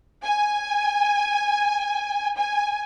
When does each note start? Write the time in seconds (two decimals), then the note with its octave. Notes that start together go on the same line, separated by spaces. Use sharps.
0.23 G#5
2.36 G#5